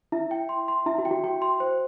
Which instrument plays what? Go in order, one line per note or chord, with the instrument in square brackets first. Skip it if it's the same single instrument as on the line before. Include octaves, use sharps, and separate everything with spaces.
[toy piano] E4 [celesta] E5
[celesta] G5
C6
C6
[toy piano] E4 [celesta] E5
[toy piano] F#4
[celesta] G5
[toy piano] F#4
[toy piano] F#4 [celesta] G5
[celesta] C6
C5